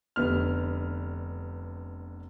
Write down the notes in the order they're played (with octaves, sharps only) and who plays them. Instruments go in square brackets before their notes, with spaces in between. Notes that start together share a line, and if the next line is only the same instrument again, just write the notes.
[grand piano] F1 D3 B3 F6